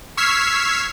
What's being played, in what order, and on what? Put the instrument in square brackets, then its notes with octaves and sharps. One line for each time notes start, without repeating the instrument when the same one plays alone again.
[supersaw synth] C#6 E6 F6 G#6 B6 C7